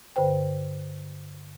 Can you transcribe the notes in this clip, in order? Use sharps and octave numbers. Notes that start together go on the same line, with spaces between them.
G2 D3 B4 C5 G5